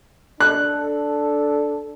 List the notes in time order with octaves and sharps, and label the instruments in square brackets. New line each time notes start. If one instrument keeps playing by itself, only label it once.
[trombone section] D4 A4 [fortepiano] F#6